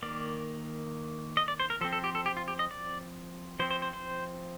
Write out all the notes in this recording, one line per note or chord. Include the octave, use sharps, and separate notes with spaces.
D#3 A#3 D5
D#5
D5
C5
A#4
F3 C4 A4
A4
G4
A4
G4
F4
G4
D#5
D5
F3 C4 C5
C5
C5
C5